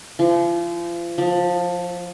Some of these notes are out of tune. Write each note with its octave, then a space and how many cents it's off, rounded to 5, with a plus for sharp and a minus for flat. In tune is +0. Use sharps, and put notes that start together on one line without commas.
F3 -35
F3 +20